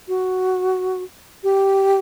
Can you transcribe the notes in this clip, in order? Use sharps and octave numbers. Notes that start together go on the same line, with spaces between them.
F#4
G4